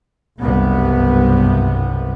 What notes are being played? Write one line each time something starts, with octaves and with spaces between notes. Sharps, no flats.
F#1 C2 G2 C3 B3